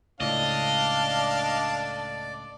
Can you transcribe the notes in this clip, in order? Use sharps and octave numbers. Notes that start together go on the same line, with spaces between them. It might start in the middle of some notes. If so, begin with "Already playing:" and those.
C#2 A2 D4 D5 D#5 F5